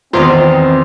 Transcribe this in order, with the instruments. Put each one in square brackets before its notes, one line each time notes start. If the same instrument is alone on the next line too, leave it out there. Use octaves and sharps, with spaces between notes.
[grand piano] E2 [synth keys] D#3 F4 [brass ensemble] C4 [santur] C5 D#5